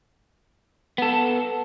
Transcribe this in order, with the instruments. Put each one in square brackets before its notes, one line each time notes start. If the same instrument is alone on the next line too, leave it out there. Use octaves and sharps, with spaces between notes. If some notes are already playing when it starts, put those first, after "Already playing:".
[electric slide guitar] B3 A4